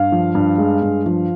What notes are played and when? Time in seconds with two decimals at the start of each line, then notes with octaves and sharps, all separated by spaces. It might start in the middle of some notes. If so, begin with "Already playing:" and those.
Already playing: G2 F5
0.12 F3
0.35 G2
0.58 G#3
0.82 G2
1.06 F3